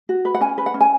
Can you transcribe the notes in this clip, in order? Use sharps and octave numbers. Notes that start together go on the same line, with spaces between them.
F#4
B4
F#5
C#4 G#5
B4
F#5
C#4
G#5